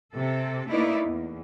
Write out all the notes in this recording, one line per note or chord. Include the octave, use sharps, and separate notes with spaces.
C3 A4
A3 A#3 D#4 E4 B4 D5
E2